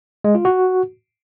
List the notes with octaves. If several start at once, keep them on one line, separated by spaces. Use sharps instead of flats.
G#3
F4
F#4